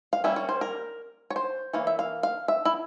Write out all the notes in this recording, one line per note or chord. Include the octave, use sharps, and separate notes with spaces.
F5
G3 A#3 C#4 E5
C#5
C5
A#4
C#5
C5
E3 A#3 C#5
E5
F5
F5
E5
E4